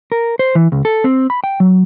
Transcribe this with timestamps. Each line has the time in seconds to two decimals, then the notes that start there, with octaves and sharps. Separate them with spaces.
0.12 A#4
0.39 C5
0.55 E3
0.72 C#2
0.85 A4
1.04 C4
1.30 B5
1.44 G5
1.60 F#3